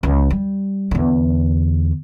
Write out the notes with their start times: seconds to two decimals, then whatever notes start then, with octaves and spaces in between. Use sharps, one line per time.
0.03 C#2
0.31 G3
0.91 E2 D3